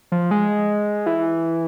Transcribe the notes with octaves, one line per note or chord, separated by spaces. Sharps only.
F3
G#3
E3